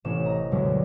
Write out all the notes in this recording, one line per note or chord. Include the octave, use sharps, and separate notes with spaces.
A1 C3 C#4 E7
D#5 A#5
D2 G2 B2 D3 F#3 G#3